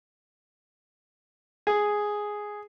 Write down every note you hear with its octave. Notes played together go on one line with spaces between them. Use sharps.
G#4